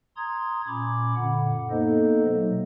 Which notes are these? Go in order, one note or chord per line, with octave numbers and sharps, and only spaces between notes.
A#5 C6 D#6 G#6
A#2 C#4 B5 D6
F#2 A#2 D3 F#5
A#3 B3 D#4 A4 C5 D#5
B2 F#3 A3 A#3